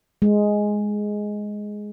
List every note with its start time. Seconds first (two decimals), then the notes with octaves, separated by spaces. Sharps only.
0.22 G#3